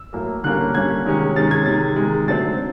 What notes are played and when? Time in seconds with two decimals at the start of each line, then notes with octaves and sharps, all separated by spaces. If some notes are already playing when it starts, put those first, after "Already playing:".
Already playing: E6
0.13 A2 F#3 A#3
0.44 D3 G3 A#3 C#4 F#6
0.74 D3 G3 A#3 C#4 G#6
1.06 C3 D#3 G#3 C#4
1.36 C3 D#3 G#3 C#4 A6
1.51 G#6
1.66 C3 D#3 G#3 A6
1.96 C3 D#3 G#3
2.28 D3 F#3 A3 C4 A6